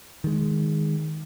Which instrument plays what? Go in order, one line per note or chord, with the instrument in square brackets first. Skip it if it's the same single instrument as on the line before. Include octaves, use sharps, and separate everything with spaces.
[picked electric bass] D#3 G#3